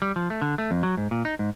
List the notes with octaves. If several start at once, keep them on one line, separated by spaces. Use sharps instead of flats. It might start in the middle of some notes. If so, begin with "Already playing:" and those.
G3
F3
A3
D3
A3
F2
F#3
G#2
A#2
D#4
G#2